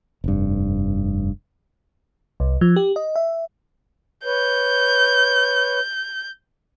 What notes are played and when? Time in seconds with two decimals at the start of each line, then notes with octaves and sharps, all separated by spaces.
0.24 F1 G2
2.40 C2
2.61 F3
2.76 G4
2.96 D#5
3.16 E5
4.25 B4 C#5 G6